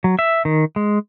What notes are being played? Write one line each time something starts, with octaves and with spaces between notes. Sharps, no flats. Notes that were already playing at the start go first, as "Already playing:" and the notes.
F#3
E5
D#3
G#3